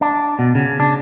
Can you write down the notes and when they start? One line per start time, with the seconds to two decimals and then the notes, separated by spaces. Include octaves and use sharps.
0.01 D4
0.39 B2
0.55 C#3
0.80 D4